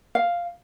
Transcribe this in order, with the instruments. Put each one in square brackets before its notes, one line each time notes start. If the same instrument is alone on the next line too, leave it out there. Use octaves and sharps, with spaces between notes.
[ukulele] F5